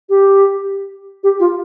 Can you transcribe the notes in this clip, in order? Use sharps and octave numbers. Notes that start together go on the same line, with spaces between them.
G4
G4
F4